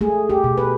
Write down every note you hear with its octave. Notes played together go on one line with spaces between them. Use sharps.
A3 G#4
G4
B2
B4